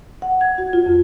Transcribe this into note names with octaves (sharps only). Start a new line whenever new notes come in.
F#5
G#6
F#4
F4
F2